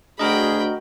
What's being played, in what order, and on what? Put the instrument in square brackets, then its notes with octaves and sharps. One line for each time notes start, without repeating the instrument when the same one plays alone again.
[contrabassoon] D2 [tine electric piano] F#4 A#4 D#5 [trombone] G#4 [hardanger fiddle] G5 B5